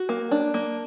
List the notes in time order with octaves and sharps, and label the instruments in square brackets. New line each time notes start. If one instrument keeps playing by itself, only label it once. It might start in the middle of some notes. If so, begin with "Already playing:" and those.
Already playing: [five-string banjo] F#4
A#3
D4
A#3